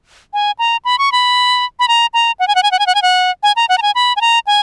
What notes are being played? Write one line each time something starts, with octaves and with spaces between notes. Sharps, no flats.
G#5
A#5
B5
C#6
B5
B5
A#5
A#5
F#5
G#5
F#5
G#5
F#5
G#5
F#5
G#5
F#5
G#5
A#5
F#5
A#5
G#5
B5
G#5
A#5
G#5